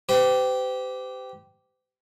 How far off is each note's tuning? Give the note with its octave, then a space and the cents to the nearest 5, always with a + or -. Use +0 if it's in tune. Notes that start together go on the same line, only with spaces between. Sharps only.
G4 -10 C5 -45